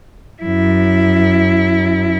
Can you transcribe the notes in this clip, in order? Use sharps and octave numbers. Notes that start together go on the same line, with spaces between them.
F#2 E4